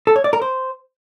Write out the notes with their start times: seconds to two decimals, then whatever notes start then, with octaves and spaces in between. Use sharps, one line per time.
0.07 A4
0.16 C#5
0.24 D5
0.33 A#4
0.42 C5